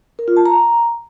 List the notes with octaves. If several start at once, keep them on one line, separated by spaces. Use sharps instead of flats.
A#4
F4
A5
A#5